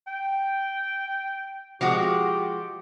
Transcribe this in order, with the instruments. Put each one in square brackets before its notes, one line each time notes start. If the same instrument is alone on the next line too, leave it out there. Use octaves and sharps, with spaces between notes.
[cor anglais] G5
[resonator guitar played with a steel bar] F3 G#3 F#4 [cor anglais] G4